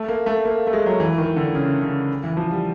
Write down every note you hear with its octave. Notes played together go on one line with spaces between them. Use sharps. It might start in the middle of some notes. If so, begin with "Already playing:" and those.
Already playing: A3
A#3
A3
A#3
A3
G#3
F#3
E3
D#3
D3
C#3
C#3
E3
F3
G3